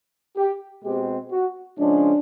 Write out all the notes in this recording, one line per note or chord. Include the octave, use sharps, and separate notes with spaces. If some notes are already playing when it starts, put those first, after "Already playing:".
G4
B2 G#3 C4 G4
F#4
C#3 F3 G#3 C#4 D4